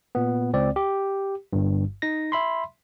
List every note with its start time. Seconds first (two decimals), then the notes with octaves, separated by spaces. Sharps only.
0.15 A#2 B3
0.53 C#2 C4 D5
0.76 G4
1.53 G1 G2
2.02 D#4 A#6
2.32 E5 B5 C6